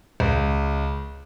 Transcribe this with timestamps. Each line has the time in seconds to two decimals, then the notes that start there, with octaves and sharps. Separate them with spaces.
0.20 C#2